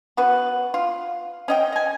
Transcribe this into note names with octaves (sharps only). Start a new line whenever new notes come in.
B3 C#4 F#4 B4
F4
C#4 D#5 G5
D#5 G#5